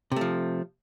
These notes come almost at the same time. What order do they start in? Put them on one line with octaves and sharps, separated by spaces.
C3 A3 F3